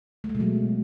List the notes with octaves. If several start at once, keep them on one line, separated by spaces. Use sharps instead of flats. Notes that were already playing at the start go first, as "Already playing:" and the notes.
A3
G#3
B2
F#3